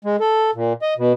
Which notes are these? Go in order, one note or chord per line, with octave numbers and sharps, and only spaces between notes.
G#3
A4
A#2
D#5
B2